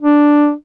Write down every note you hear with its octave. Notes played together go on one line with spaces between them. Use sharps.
D4